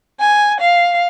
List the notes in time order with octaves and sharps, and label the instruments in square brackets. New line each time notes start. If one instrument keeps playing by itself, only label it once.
[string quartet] G#5
F5